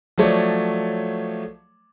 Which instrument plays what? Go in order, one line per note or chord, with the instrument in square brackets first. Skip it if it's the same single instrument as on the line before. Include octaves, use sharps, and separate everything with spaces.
[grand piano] F3 F#3 A3 C#5 D5